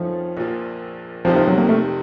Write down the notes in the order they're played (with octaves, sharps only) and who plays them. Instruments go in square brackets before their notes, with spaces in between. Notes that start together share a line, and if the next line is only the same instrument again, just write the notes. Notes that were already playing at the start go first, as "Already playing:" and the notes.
Already playing: [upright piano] F2 D#3 A3 C#4 A4 [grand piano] F3
[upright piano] A#1 A#2 F3
[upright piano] F1 F2 C3 D#3 [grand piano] F3
[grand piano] F3
F#3
A#3
A3